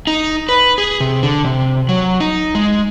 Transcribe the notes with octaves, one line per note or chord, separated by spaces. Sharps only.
D#4
B4
G#4
C3
D3
C3
F#3
D#4
G#3